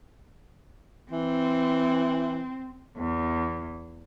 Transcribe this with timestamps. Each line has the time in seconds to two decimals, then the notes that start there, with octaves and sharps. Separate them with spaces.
1.11 E3 C4
2.97 E2